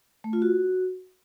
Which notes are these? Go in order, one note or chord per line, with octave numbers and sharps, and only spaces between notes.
A3
F4
F#4